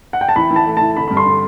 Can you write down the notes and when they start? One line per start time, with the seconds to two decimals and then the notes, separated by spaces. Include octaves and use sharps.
0.13 F#5
0.21 G5
0.29 A5
0.36 E3 B5
0.51 E3
0.56 A5
0.66 A3
0.77 E3 A5
0.96 D3 B5
1.08 G2 B5
1.17 C6
1.26 D3